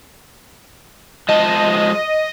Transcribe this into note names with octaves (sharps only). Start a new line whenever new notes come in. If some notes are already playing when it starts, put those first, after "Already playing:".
F3 G#3 D#5 A5